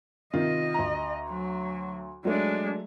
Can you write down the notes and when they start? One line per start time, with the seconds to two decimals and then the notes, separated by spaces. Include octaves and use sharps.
0.34 C3 D#3 F4 D#5
0.74 D2 A#5
1.29 F#3
2.25 F#3 G#3 A3 D4